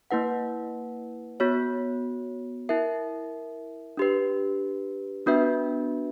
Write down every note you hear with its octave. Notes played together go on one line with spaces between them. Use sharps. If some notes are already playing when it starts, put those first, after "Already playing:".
A#3 E4 B4 F#5
B3 F#4 C#5
E4 A#4 E5
D4 G4 B4
B3 D4 F#4 B4 E5